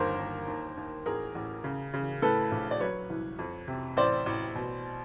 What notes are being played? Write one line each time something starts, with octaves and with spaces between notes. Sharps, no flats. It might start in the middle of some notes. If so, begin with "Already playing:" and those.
Already playing: G1 D#2 A#4 C5
D#2
D#2
D#2
A1 G#4 A#4
A1
C#3
C#3
A2 A4 B4
A#1
D5
F#3 B4 C#5
C2
F2
C3
A1 C5 D5
A1
B2